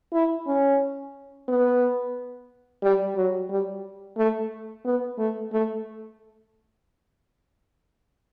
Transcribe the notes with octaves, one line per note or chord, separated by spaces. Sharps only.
E4
C#4
B3
G3
F#3
G3
A3
B3
A3
A3